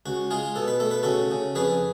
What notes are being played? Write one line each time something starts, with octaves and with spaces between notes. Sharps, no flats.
C#2 F#4
G#3 F4 G#4
B2 A4
B4
A3 A4
B4
C#3 F#4 A4
C#3
F2 G#4 B4